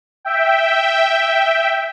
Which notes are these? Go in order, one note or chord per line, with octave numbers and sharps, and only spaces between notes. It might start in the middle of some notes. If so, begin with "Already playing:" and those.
E5 G5